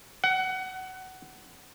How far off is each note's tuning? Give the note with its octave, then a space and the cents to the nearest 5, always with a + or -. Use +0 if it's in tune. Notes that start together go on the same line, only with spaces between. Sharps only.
F#5 +20